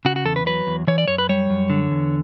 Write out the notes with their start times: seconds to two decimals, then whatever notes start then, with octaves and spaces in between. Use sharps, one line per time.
0.05 C#3 F#4
0.16 F#4
0.25 E2 A4
0.36 B4
0.46 F#3 B4
0.67 E2
0.87 E3 C#5
0.98 D5
1.08 F#2 C#5
1.18 B4
1.29 G3 C#5
1.50 F#2
1.70 D3
1.91 E2